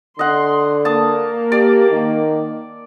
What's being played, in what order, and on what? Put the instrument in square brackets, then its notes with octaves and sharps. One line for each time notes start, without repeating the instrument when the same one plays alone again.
[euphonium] D3 [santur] D#5 F#5 [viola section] C6
[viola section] A#3 [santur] A5 D#6
[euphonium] G4 [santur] D5
[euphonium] D#3